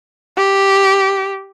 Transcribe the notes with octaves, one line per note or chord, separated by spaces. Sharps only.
G4